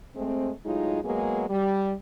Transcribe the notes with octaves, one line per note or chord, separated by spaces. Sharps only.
G#3 A3 C4
A2 F#3 G#3 D#4 F4
F#3 G#3 A#3 B3 G#4
G3